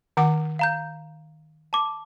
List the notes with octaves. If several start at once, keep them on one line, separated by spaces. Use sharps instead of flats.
D#3 F#5 D6
F5 A#5 G6
A5 D6